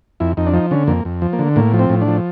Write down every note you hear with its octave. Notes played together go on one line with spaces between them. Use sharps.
F2 E4
F2 D#4
D4
F3 D#4
D3 C#4
F2 A#3
F2
F3
A#3
D3
A2 A#3
F3
C4
A2
D4
F3